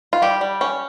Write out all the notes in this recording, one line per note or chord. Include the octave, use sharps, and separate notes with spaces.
F4
G3 G4
G3
C#4